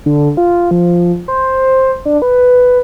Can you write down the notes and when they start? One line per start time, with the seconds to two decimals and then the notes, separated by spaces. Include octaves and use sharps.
0.06 D3
0.37 F4
0.71 F3
1.28 C5
2.05 D4
2.22 B4